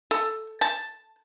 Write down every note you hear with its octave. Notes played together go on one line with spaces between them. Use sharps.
A4
A5